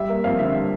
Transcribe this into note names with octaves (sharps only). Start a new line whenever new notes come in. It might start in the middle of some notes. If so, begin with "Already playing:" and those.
Already playing: G3 E5
A#3
F2 F5
D3 E5
G3